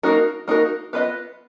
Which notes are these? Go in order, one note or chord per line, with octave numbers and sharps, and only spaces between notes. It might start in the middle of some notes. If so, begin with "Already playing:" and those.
A#3 D#4 F#4 A#4
A#3 D#4 F#4 A#4
B3 F4 B4 D#5